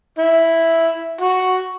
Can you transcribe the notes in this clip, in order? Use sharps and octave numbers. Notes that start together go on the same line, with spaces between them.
E4
F#4